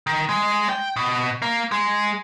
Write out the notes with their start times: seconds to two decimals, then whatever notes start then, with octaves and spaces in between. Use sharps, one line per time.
0.07 D#3
0.29 G#3
0.69 G5
0.96 B2
1.42 A#3
1.72 G#3